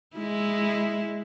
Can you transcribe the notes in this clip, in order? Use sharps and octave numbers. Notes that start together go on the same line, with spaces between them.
G#3 E4